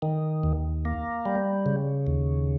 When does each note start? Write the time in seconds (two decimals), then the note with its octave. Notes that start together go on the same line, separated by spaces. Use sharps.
0.02 D#3
0.43 D#2
0.85 A#3
1.26 G3
1.66 C#3
2.07 D#2